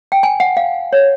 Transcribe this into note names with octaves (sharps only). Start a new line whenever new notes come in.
G5
G#5
F#5
F5
C#5